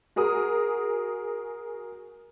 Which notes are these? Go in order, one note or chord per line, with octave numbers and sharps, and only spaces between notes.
F#4 G#4 A#4 D#6